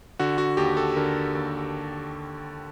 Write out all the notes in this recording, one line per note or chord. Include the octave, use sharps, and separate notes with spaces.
D3 F#4
F#4
D#2 G4
A4
D3 A#4
D#2